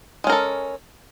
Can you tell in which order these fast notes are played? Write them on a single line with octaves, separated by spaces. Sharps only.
G#3 C#4 A#4 A4